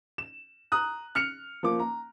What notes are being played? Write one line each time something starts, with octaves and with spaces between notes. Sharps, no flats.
E7
A#5 D#6 F#6
F6 C#7 F7
F3 A#3 D6
A#5